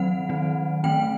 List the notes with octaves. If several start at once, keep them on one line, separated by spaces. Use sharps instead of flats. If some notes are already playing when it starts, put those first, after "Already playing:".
Already playing: D#3 F#3 C4 F#5
D#3 F#3 C4
D#3 A3 C4 G5